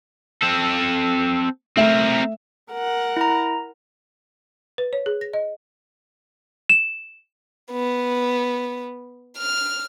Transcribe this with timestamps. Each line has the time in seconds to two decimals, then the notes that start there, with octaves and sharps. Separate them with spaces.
0.42 C4 A4
1.77 A3 C4 A#4 E5 E7
2.73 A#4 F#5
3.17 E4 A#5
4.78 B4
4.93 C#5
5.06 G#4
5.21 A#6
5.33 D#5
6.70 E7
7.71 B3
9.38 F6